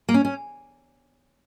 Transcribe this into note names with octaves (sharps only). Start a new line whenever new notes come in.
A#3
C#4
C#4